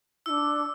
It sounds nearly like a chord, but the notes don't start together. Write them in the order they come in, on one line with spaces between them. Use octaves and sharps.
E4 E6 D4